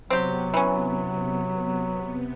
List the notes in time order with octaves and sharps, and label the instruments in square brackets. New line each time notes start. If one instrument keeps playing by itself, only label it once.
[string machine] C3 B3 [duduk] F#3 [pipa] C4 G4
[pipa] E3 C#4